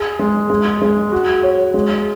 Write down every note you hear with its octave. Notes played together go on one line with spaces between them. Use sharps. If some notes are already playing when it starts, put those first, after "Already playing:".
Already playing: G#4
G#3
G#3
G#3
F#4
C#5
G#3